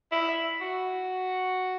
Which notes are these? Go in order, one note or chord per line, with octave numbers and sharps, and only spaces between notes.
E4
F#4